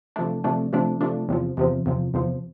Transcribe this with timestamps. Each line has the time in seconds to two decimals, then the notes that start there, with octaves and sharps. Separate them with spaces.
0.16 C3 F3 A3 D4
0.44 C3 F3 A3 D4
0.73 C3 F3 A3 D4
1.01 C3 F3 A3 D4
1.29 E2 C3 F3
1.57 E2 C3 F3
1.86 E2 C3 F3
2.14 E2 C3 F3